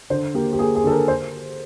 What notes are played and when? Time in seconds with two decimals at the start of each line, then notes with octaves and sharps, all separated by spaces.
0.10 D3 C5
0.34 A#3 G4
0.53 G4
0.59 A#3 G#4
0.75 G#4
0.84 D3 A4
0.91 A#4
1.08 C5